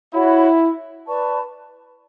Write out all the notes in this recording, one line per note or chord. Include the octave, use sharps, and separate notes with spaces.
E4 F#4 C#5 F#5 B5
B4 D5 A5 C#6